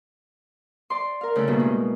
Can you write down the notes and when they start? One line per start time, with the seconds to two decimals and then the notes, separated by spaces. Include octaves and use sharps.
0.90 D5 C6
1.21 A#4 F5
1.35 C#3 A3 E4 A4
1.48 G2 B2 A#3
1.60 G#3